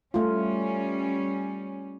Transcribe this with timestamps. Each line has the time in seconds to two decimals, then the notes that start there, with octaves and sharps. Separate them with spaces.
0.14 G3 A3 C#4 F4